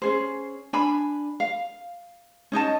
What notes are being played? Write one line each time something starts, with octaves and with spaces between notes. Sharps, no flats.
C#4 G#4 C5
D4 G#5 B5
F5
C#4 D#4 D#5 A5